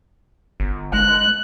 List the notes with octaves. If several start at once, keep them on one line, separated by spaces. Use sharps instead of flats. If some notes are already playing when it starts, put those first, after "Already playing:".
G1
G#3 F#6